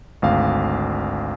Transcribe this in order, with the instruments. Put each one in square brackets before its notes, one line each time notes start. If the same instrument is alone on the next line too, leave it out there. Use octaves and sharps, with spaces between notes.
[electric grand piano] G#1 D2 F5